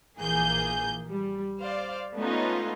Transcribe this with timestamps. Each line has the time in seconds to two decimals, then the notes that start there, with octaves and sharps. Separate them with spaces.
0.19 A#1 E3 A#3 G#4 G6
1.08 G3
1.60 C5 D5 F5
2.16 A3 B3 C#4 D#4 F4